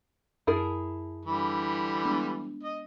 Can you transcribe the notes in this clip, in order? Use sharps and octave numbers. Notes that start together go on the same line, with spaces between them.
F#2 E4 G#4 A#4 A5
D3 E3 G3
G#3 B3 D4
D#5